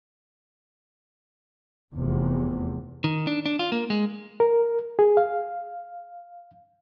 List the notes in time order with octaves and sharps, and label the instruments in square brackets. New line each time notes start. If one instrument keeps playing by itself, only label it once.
[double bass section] F1 E2 C3
[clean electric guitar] D#3
D4
D4
F4
A#3
G#3
[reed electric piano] A#4
G#4
F5